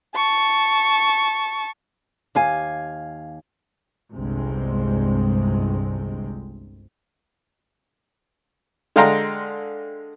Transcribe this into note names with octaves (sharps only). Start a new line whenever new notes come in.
A5 C#6
D#2 F5 G#5
G1 C2 G2 C3 G#3 C4
D3 G#3 F5 G5 A#5 C6